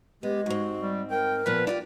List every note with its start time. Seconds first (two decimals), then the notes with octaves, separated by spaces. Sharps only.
0.23 G#3 B3 G4
0.46 G#2 C4 F#4
0.80 G3
1.11 A#4 G5
1.46 A#2 F3 B3 B4
1.67 E4 F4 G4 D5